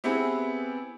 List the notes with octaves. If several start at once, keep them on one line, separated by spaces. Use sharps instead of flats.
B3 C4 E4 G4 G#4 B4